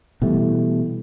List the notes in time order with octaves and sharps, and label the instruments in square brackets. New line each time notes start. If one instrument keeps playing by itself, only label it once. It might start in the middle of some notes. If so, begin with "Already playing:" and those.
[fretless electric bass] B2 E3 G3 A3